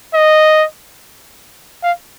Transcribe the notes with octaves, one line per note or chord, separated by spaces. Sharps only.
D#5
F5